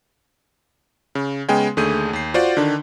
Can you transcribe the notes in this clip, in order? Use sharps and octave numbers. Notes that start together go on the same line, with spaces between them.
C#3
C#3 G#3 B3 G5 G#5
D#2 D3 A3 G#4 G6 D#7
D#2 C7
F4 F#4 C5 D5 F#5
D3 D#3 D4